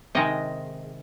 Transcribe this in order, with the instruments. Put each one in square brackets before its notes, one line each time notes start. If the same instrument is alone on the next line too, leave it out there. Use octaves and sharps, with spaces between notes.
[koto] C3 D#3 G#3 D#5